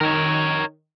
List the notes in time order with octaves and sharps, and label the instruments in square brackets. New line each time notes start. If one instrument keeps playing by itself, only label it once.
[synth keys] D#3 [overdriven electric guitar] A#4 C#5